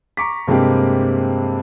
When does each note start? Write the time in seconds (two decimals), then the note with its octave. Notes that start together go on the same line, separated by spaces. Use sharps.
0.17 A#5 C#6 D6 B6
0.47 G2 C3 G#3 A#3 C4 G4